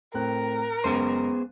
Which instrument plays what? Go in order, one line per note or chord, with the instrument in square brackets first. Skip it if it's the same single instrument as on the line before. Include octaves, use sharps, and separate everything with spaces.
[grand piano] A2 C4 F#6 [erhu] A#4
[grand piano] F#1 G#3 D#7 [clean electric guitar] B3 G#4 C5